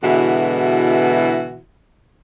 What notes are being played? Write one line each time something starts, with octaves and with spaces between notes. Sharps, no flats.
B2 D3 E3 G#3 E4 F#4